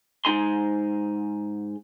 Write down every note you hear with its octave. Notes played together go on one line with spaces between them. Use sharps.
G#2 D4 D#4 G#5 C6